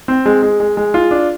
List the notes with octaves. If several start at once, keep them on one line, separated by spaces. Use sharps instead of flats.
C4
G#3
G#3
G#3
G#3
F4
D4